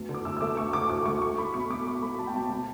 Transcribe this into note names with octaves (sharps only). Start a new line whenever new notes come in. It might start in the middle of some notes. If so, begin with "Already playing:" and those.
Already playing: D2 B3
D3
D6
D2 E6
E6
A3 D6
D2 C#6
D3 D6
D2 D6
A3 C#6
A3 C#6
A3 B5
B2 C#6
B2 D6
A3 C#6
A3 B5
B2 A5
G5
B2 A5
B2